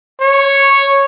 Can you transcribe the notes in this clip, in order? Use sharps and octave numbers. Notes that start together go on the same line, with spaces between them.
C#5